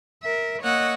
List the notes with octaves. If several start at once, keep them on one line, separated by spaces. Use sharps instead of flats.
A#4 E5
A#3 C#5 D#5 F#5 E6 F#6